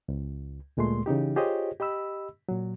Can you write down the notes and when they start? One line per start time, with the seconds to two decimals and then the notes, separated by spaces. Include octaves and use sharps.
0.08 C#2
0.77 D2 A#2 G#3 A3 C6
1.06 C#3 E3 D#4 G4
1.36 F4 G4 G#4 C5 C#5 D#5
1.80 G4 D#5 B5 E6
2.49 A#2 F#3